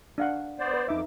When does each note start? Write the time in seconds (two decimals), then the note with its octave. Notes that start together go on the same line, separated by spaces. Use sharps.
0.18 D4 F5 F#5
0.59 B3 C5 D5
0.74 B4
0.88 F2 D#4 E5 D6